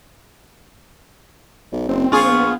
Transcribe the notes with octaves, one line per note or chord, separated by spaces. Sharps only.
B1
F#1 C4
A#1 F4 G#4 C#6
B3